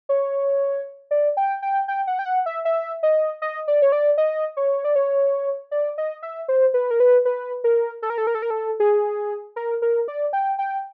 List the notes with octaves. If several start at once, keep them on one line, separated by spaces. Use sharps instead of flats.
C#5
D5
G5
G5
G5
F#5
G5
F#5
E5
E5
D#5
D#5
D5
C#5
D5
D#5
C#5
D5
C#5
D5
D#5
E5
C5
B4
A#4
B4
B4
A#4
A4
A#4
A4
A#4
A4
A#4
A4
G#4
A#4
A#4
D5
G5
G5